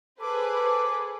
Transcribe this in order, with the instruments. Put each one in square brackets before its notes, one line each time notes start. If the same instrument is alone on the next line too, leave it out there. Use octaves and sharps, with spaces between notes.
[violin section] G#4 B4 C5 [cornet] A4 [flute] D6